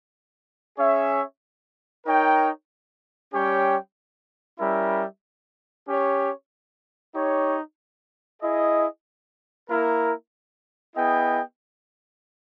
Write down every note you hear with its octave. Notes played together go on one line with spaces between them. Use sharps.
C#4 G#4 C#5 E5
D#4 A#4 C#5 G5
G3 C#4 G4 C#5 G5
G3 C#4 E4 A#4 E5
C#4 G4 C#5
D#4 G4 C#5
E4 G#4 D#5
A#3 E4 A#4
B3 E4 G#4 D#5 G5